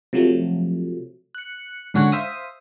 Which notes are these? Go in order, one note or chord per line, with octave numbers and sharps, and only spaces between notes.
C3 F3 F#3 A3
F#6 C#7
G#2 D3 C#4 F#4 C#5 F#5
C5 E5 F5 D#6